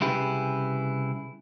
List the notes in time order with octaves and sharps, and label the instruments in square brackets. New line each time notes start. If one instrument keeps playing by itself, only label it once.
[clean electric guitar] C2 C#3 E4 G4 G#4 B4